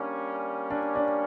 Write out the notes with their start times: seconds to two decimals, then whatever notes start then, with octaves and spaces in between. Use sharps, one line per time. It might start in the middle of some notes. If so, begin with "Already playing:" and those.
Already playing: G3 A#3 C#4 D4
0.70 D4
0.96 D4